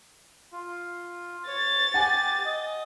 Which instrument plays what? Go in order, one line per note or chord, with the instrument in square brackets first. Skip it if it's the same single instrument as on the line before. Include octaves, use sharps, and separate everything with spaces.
[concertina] F4
[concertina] C#5 [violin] A6
[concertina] G4 [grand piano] F#5 G#5
[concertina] D#5